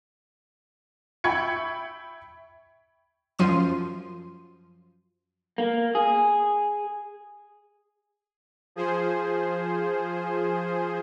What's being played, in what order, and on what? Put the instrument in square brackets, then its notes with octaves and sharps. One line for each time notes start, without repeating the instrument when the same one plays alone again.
[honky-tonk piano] E5 G5 B5 C#6 G#6 C#7
[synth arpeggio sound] F#2 F3 C6 D#7
[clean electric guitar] A#3
G#4
[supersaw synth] F3 G#4 C5